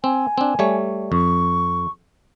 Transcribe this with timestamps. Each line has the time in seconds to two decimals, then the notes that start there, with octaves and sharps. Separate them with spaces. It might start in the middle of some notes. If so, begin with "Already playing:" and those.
0.04 C4 G#5
0.38 C4 D4
0.59 G3 A3 C#5
1.12 F2 C#6